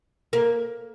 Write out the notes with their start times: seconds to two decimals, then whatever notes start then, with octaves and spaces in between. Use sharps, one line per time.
0.33 A#3